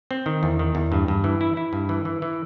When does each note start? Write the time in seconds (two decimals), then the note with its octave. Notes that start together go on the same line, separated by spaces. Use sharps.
0.11 C4
0.26 D#3
0.43 E2
0.59 D#3
0.75 E2
0.92 G2
1.08 G2
1.24 E3
1.41 E4
1.57 E4
1.73 G2
1.89 E3
2.05 E3
2.22 E3